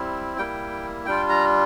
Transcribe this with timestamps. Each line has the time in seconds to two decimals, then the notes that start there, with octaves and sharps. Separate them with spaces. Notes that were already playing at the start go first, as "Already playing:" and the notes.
Already playing: G3 C4 E4
0.38 G3 A#3 E4 G5
1.06 G3 D4 F4 G5
1.29 A#5